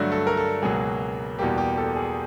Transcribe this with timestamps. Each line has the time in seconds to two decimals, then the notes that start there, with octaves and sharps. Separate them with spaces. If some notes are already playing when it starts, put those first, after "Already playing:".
Already playing: G2 D3 F#3 A3 F#4
0.12 A4
0.27 A#4
0.37 A4
0.62 C#2 B2 F#3 A#3 G#4
1.39 E2 B2 G3 A#3 G4
1.57 G4
1.77 A4
1.96 G#4